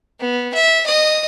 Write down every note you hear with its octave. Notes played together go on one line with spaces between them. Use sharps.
B3
E5
D#5 D#6